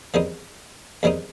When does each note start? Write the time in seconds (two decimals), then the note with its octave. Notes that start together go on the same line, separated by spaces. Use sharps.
0.14 E2 D#3 G3 C4 D#4
1.03 E2 D#3 G3 C4 D#4